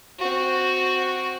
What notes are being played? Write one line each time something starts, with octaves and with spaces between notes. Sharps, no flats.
C4 F#4